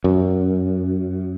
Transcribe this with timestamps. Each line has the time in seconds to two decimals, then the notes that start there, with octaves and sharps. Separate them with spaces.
0.04 F#2